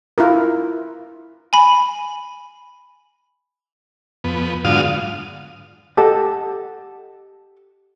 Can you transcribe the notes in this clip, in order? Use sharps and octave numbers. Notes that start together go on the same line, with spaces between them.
E4 F4 A#4
G#5 B5
F2 B3
G#2 D3 F#3 F4 F5 D#6
G4 A4 D#5 F#5 A5